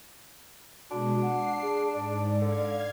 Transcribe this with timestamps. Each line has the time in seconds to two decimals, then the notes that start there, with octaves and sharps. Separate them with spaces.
0.91 B2 G#3 D4 F#4
1.22 F#5 C7
1.62 G#4
1.94 G#2 D5
2.42 D3 F5 G#6